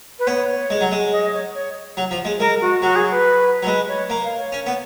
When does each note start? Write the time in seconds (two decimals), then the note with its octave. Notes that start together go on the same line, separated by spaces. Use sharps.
0.19 B4
0.27 B3 C#5
0.70 G#3
0.81 F#3
0.92 G#3
1.12 D#5
1.23 D#5
1.34 C#5
1.55 C#5
1.97 F#3
2.11 F3
2.25 G#3
2.39 G#3 A#4
2.61 F#4
2.82 F#3 F#4
2.96 G#4
3.11 B4
3.63 F#3
3.66 G#3 B4
3.88 C#5
4.10 A#3
4.24 F5
4.38 C#5
4.52 C#4
4.66 B3